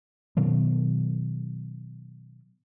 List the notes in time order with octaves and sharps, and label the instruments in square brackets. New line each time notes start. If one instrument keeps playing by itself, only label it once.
[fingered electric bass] B2 D#3 F#3